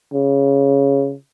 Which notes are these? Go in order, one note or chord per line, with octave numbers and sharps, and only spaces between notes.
C#3